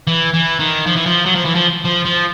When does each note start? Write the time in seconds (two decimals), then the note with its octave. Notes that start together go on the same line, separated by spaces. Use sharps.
0.07 E3
0.34 E3
0.59 D#3
0.87 F3
0.96 E3
1.06 F3
1.26 F#3
1.36 F3
1.45 E3
1.55 F3
1.85 F3
2.06 F3